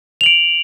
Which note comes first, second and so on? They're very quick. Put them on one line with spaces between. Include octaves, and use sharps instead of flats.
F7 F#7 D7